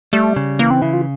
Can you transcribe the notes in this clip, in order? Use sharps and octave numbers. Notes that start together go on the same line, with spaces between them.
G3 A3
C#3
E3 A#3
C4
C#3 E4
F4